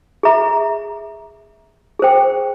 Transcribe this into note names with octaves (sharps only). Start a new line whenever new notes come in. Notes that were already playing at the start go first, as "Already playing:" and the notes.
G#4 E5 A#5
G#4 C5 G5